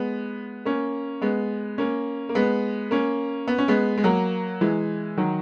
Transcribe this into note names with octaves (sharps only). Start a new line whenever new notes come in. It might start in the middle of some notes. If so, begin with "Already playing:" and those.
Already playing: G#3 B3
A#3 C#4
G#3 B3
A#3 C#4
A#3
G#3 B3
A#3 C#4
B3
C#4
G#3 B3
G#3
F#3 A#3
E3 G#3
D#3 F#3